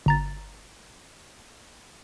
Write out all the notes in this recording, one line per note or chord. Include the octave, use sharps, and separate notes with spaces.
G1 A#5 A6